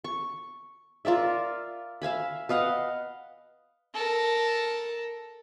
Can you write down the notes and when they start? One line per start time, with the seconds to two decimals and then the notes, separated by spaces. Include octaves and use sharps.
0.04 C#6
1.05 F4 A#4 D5 E5
2.02 E5 F5 G#5 B5
2.49 B4 D#5 F5 F#5
3.94 A4 A#4